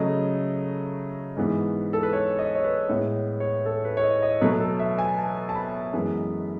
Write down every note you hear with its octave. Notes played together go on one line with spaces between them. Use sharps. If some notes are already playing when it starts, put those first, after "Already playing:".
Already playing: C#3 F#3 A3 D#5
G#2 E3 G#3 B3
A4
B4
C#5
D#5
C#5
B4
A2 G#3 B3 C#5
C#5
A4
B4
C#5
D#5
D#5
B2 F#3 A3 B4
A4
E5
G#5
A5
A5
B5
F#2 E3 G#3 B3